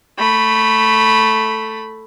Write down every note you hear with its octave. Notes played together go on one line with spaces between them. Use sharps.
A3 B5